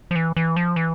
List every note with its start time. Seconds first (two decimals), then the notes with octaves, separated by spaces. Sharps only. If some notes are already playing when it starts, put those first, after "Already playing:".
0.11 F3
0.16 E3
0.37 E3
0.56 F3
0.76 E3